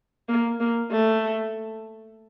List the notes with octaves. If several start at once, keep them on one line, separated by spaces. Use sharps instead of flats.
A#3
A#3
A3